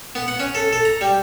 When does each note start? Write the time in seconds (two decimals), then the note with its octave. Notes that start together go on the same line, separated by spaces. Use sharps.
0.15 B3
0.28 F#5
0.40 C#4
0.55 A4
0.73 A4
0.85 A#5
1.01 G3